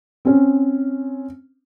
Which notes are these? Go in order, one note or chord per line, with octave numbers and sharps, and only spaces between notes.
C4 C#4